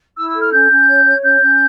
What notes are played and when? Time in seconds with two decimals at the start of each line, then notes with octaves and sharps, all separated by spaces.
0.17 E4 E6
0.29 E6
0.34 A4
0.40 F6
0.52 C#4 G6
0.70 C#4
0.88 C#5
1.05 C#5
1.23 C#4 G6
1.41 C#4